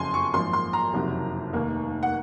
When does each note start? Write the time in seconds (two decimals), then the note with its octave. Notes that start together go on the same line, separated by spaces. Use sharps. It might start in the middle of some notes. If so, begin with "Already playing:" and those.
Already playing: F#1 F2 C#3 F#3 G#5 C6
0.14 C#6
0.34 G#1 F#2 F3 A#3 C6
0.53 C6
0.73 A#5
0.93 F#1 F2 C3 D#3 F#3
1.53 F1 D#2 D#3 A#3
2.03 F#5